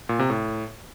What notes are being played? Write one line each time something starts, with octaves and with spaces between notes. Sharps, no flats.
A#2
C3
A2